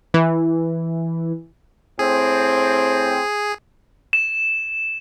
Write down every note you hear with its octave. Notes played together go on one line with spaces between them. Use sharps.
E3
A2 C4 G#4
E7